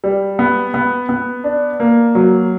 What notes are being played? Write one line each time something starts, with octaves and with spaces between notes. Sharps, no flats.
G3
B3
B3
B3
D4
A#3
F#3